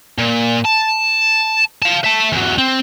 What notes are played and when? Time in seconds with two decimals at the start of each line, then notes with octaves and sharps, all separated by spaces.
0.19 A#2
0.65 A5
1.82 F5 A5
2.04 E5 A5
2.33 E2 F#3
2.58 C4